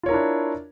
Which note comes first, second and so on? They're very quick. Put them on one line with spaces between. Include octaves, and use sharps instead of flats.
F4 C#5 A#4 E4 D4